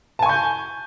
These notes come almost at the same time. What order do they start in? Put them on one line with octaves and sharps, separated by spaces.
A5 G#5 C#6 G6